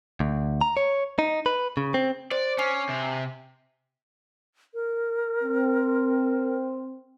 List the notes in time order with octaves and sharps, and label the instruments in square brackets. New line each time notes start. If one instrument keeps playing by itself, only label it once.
[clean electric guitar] D2
A#5
C#5
D#4
B4
C#3
C4
[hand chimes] C5 [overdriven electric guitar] D5
[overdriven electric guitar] C#4 [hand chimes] G#5 D6 C7
[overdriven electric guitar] C3
[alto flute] A#4
[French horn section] C4